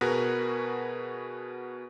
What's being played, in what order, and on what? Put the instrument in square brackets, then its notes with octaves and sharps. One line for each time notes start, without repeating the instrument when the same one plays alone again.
[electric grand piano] B2 F#4 G#4 A#4 B4